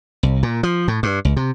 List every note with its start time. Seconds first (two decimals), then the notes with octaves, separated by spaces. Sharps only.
0.23 C2
0.43 A#2
0.63 F3
0.88 A2
1.03 G2
1.25 C#2
1.36 C3